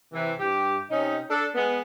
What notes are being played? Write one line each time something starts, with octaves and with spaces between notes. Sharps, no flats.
C3 E3
G2 G4
C3 C#4 D#4
D4 A4
G#3 B3